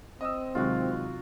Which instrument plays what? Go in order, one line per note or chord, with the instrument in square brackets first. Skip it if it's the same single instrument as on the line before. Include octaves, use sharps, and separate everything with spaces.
[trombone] C4 [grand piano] D#5 D#6 E6
[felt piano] C3 F#3 D#4 [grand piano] D#3 G#3 [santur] F4 F#4